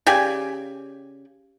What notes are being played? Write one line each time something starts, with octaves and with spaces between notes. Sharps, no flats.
C#3 G4 D5 G#5